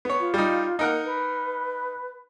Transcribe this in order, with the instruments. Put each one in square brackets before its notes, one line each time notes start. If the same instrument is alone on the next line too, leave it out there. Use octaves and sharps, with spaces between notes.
[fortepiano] B3 C#5
[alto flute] F4
[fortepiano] G3 D#4
[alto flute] A#3 [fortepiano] D#4 A#4 F#5
[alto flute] B4